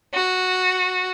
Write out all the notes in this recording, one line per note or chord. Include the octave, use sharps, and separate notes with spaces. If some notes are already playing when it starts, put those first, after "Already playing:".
F#4